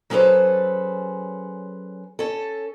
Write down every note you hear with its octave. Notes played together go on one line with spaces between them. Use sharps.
F#3 C#4 G#4 A4 B4 C5
C#4 A4